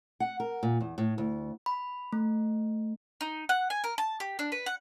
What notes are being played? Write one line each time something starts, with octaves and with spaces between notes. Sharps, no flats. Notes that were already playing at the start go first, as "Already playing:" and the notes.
F#5
A#4
A#2
E2
A2
D2
B5
A3
D#4
F#5
G#5
A#4
A5
G4
D4
B4
F#5